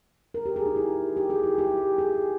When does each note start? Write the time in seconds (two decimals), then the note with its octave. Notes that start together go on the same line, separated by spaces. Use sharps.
0.34 A#4
0.46 G4
0.56 G#4
0.66 D#4
0.76 E4
1.17 G4
1.30 G#4
1.44 E4
1.58 G4
1.98 G#4